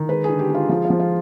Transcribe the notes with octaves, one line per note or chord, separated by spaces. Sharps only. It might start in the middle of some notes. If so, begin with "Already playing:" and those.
Already playing: D#3
G#3 B4
G#4
D3
G4
G#3 F4
F3 F4
F4
F3
F4